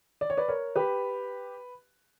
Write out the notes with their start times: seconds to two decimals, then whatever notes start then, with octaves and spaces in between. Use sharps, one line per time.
0.21 D5
0.30 C#5
0.37 B4 D5
0.48 A#4 C#5
0.76 G4 B4